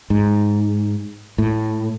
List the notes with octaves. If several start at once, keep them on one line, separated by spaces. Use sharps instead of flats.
G#2
A2